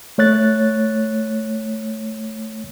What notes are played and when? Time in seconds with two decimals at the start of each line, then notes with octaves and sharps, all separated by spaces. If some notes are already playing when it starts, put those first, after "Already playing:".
0.18 A3 C#5 F#6 A6